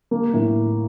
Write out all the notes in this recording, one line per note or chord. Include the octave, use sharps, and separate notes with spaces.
A#3
A2